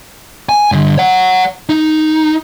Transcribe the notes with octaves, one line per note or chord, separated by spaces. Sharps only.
G#5
G2 D3
C#5 F#5
D#4